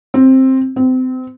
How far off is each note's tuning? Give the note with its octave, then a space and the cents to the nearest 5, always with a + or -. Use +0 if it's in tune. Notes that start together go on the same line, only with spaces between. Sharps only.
C4 +10
C4 -30